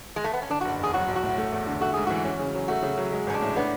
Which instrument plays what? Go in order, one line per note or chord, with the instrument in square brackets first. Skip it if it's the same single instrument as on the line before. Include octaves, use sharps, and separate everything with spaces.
[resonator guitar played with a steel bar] G#3
A3
B3
C#4
[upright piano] D3 [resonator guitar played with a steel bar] D4
[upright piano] F#1 [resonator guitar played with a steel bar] F#4
[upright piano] E2 [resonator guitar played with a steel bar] G#4
[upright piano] F#3 [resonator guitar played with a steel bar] F#4
[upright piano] B1
[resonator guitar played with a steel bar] F#4
[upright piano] A2
A3
E2
D3
[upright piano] A3 [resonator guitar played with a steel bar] F#4
[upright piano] G#2 [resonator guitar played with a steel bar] G#4
[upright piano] E3 [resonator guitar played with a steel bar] F#4
[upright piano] C#4
C#3
F#3
[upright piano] A3 [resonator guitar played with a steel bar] F#4
[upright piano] C#3
F#3
G#3
[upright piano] A1 [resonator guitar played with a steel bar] C#4
[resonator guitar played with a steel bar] D4
[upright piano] A2
[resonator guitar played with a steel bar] B3 [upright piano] D4